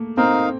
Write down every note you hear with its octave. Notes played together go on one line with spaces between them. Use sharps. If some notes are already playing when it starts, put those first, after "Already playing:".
Already playing: A3 A#3
C4 D#4 A#4 F5